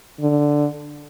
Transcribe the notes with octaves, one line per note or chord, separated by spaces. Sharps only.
D3